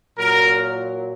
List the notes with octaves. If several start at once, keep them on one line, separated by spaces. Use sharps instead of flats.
A#2 F#3 A#4